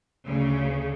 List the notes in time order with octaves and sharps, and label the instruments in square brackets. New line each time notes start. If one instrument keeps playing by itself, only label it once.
[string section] D2 C#3